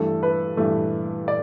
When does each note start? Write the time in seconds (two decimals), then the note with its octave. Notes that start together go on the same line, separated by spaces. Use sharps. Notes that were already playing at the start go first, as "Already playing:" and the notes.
Already playing: G2 E3 A3 A4
0.23 B4
0.57 G2 E3 A3
1.28 D5